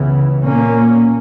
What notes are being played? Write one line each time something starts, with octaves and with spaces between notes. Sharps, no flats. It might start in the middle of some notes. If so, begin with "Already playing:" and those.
Already playing: C#2 C#3 E3 B3
A#2 A#3 C#4